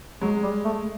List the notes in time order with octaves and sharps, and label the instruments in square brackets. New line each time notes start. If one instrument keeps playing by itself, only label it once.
[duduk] F#3 [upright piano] G#3
[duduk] G3
A3